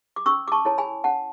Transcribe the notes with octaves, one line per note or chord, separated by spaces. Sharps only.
D6
C#4 C#6 E6
D6
A5 C#6
E4 A4 C#5 A5
G#5 B5
C#4 F#5 A5